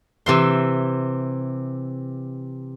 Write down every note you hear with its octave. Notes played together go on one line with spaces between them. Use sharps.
C3 E3 C6